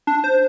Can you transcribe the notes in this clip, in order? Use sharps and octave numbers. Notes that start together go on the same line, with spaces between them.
D4
C5